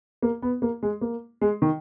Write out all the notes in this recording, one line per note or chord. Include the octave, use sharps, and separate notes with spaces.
A#3
B3
A#3
G#3
A#3
G#3
D#3